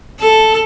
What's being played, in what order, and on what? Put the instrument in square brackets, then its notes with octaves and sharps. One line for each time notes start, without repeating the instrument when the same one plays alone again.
[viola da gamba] A4